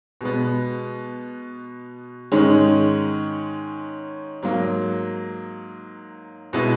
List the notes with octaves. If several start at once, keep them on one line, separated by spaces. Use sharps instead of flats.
B2 G#3 B3
G#2 D#3 G#3 C#4
G#2 F#3 A#3
B2 G#3 B3 E4